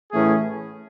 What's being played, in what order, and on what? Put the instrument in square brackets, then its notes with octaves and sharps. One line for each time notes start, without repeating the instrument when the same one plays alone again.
[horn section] A2 E3 A3 C#4 G#4